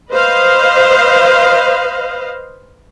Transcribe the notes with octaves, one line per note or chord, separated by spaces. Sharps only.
B4 C5 D#5 F5